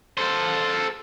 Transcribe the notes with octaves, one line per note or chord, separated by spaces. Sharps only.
A4 C5